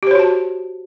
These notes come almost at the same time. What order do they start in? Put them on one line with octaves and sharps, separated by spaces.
G4 C5 C#5 F#4 A5